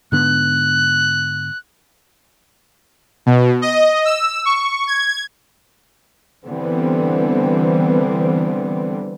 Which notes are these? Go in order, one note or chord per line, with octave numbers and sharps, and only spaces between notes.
G#2 D3 B3 F#6
B2
D#5
E6
C#6
G#6
D3 E3 G3 B3 C4